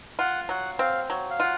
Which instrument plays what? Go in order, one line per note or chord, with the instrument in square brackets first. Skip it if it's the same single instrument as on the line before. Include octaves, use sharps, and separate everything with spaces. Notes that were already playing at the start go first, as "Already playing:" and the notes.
[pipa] F4 [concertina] F#5
[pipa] F#3 [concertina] F#5
[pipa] C4 [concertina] F5
[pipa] F#3
[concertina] F5
[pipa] F4 [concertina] F#5